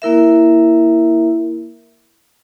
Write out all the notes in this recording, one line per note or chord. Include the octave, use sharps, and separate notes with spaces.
A#3 E4 A#4 E5